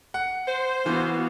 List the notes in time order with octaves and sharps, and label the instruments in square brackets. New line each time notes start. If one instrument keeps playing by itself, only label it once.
[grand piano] F#5
[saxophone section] C5
[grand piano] E3 [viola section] B3 F#4 F5